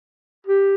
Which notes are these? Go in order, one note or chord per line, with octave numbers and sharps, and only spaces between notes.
G4